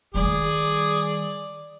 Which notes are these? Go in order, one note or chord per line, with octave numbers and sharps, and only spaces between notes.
D#3 G3 G#4 D5